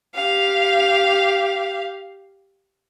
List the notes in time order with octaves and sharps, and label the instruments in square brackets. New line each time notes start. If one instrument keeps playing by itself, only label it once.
[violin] G4 F5